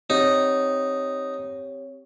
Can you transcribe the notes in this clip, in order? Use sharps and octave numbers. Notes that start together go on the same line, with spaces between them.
C4 D#4 G4 C#5